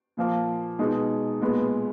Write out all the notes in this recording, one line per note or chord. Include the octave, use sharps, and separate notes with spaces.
A#2 F3 A#3
B2 G#3 D#4
A#2 G#3 B3